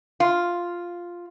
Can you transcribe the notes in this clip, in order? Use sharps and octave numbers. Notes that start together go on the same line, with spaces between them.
F4